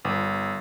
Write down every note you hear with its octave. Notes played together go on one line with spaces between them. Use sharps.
G1